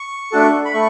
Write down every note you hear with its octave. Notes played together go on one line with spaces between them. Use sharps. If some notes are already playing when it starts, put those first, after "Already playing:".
Already playing: C#6
A3 D4 F#4 A4
B5
A3 C#6